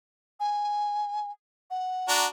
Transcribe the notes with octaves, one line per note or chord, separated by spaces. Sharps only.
G#5
F#5
D4 F#4 A#5